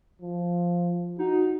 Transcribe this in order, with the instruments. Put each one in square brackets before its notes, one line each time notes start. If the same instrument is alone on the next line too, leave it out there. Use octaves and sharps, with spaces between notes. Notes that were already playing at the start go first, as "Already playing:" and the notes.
[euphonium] F3
[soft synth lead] D#4 [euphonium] F#4